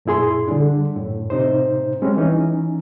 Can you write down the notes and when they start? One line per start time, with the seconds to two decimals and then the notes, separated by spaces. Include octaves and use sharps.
0.06 F#2 A#2 E4 G#4 C6
0.47 D3 G3 D4
0.96 F#2 A2
1.30 A2 C3 D#4 C5
2.02 G3 G#3 C4 C#4
2.17 E3 C#4 D#4